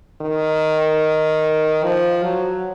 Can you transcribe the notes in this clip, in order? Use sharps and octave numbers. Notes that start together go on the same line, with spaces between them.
D#3
F3
F#3